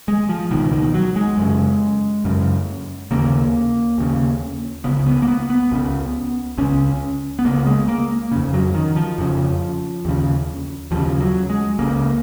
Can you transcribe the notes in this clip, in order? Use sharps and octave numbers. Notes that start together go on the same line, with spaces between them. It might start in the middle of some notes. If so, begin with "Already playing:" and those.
G#3
F3
C#2 B2 D#3
D#3
F#3
G#3
F#2 C#3
F#2 C#3
D#2 C#3 A#3
D#2 C#3
C#2 C#3 B3
B3
A#3
B3
B3
C#2 C#3
C#2 C#3 C#4
B3
C#2 C#3 A#3
G#3
A#3
F2 C#3
F#3
D#3
F3
F2 C#3
D#2 C#3
D#2 C#3 F3
F#3
G#3
C#2 C#3 A#3